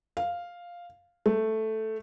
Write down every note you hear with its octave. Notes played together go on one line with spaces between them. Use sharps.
F5
A3